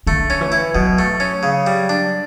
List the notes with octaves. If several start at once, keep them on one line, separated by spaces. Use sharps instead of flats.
D3 A3
C#4
E3
E4
B2 F#3
A3
C#4
C#3
G3
D4